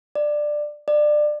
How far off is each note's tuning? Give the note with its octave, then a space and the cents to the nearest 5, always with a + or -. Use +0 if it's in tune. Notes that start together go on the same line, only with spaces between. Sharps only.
D5 +15
D5 +25